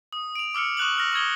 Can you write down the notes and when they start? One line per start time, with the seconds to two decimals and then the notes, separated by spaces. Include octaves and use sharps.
0.12 D#6
0.35 D7 F7
0.54 D6 E6 F6 C#7
0.77 C#6 D#6 F#6 F7 F#7
0.98 F6 A#6
1.13 C#6 D#6 G#6 G7